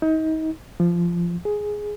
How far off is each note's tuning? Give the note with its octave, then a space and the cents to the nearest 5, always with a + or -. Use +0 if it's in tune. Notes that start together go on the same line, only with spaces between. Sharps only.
D#4 +30
F3 -15
G#4 +5